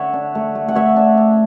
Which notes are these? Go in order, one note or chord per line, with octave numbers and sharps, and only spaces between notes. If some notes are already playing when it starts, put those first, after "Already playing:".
Already playing: D3 C#5 E5 F#5
D4
A3
A3
F#5
A3 C#5 E5
D4
D4